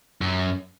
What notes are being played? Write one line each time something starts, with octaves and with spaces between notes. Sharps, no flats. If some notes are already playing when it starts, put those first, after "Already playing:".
F#2